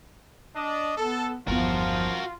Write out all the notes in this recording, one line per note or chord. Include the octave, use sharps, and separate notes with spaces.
D4 D#5
B3 A4
G1 E2 F3 B3 F4 F#4 A#4